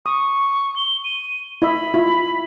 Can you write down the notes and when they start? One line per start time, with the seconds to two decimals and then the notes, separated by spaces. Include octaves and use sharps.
0.06 C#6 D#6
0.76 G7
1.04 D#7
1.62 E4 D#5 E5 B5
1.94 E4 F4